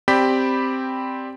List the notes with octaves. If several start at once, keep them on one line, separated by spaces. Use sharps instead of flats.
C4 G4 D5 B5 G6 B6